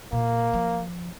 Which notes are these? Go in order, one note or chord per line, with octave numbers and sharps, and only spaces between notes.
A#2 A#3
F3